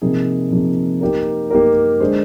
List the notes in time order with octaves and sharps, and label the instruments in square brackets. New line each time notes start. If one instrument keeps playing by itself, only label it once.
[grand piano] C3 F3 A#3 D#4 G#4
C3 F3 A#3 D#4 G#4
A#3 D#4 G4 A#4
A#3 D#4 G4 A#4
D3 G#3 D4 G#4 C5